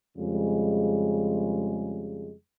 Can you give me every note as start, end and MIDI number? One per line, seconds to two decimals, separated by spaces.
0.17 2.32 41
0.17 2.32 49
0.17 2.32 55
0.17 2.32 56